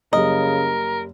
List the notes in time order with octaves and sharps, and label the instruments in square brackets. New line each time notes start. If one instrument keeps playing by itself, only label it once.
[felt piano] F#1 G3 [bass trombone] C#3 [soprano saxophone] A#4 [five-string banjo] D#5